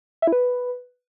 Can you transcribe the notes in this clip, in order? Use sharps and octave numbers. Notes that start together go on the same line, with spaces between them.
E5
E4
B4